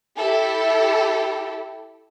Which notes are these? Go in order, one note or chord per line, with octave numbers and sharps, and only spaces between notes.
E4 G4 A4